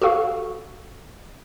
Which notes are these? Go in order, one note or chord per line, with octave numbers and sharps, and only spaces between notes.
F#4 G4 A4 F5 C#6